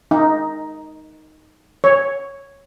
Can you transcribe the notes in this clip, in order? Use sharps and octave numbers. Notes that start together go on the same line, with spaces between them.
D#4
C#5